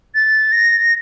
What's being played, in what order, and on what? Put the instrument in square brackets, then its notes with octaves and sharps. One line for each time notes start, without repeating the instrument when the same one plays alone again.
[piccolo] A6
A#6